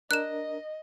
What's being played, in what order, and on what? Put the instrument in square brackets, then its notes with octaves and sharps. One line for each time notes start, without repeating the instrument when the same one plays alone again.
[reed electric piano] D4 A#4 [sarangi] D#5 [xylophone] F#6 E7